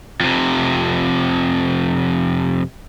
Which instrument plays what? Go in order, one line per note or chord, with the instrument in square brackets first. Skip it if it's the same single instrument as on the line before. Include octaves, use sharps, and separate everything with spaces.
[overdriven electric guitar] F2 C3